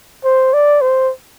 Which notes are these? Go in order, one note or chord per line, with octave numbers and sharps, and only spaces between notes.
C5
D5
C5